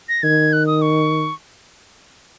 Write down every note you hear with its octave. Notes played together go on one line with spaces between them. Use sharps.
A#6
D#3 G#6
F#6
D#6
C#6